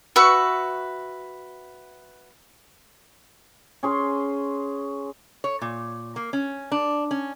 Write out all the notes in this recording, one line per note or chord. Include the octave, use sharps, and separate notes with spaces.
F#4 B4 E5 C#6
C#4 G#4 C6
C#5
A#2
A#3
C#4
D4
C#4